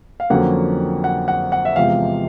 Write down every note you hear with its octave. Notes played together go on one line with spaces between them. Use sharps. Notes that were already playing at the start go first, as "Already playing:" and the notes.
F5
F2 D3 F#3 A#3 C#4 F#5
F#5
F#5
F#5
E5
E2 C3 F3 G#3 F5